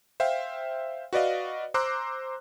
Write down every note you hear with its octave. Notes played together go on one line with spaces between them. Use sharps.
C5 E5 F5 G5
F#4 B4 D5 D#5 F5
C5 A#5 C6 D6 E6 F#6